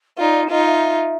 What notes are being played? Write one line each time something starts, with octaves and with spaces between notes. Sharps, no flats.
D#4 F4 D5
D#4 F4 D#5
E5